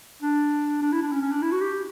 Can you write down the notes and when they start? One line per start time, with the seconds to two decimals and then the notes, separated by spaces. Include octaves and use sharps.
0.22 D4
0.82 D4
0.92 E4
1.02 D4
1.12 C#4
1.22 C#4
1.32 D4
1.42 E4
1.52 F#4
1.61 G4